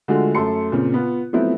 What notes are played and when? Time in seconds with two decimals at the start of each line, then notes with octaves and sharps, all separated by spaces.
0.08 D3 G#3 A3 F4 F#4
0.35 F#2 A3 A4 A5 C6 C#7
0.72 A#2 C#3 C4
0.94 B3 F4
1.33 F3 F#3 A3 B3 C4 E4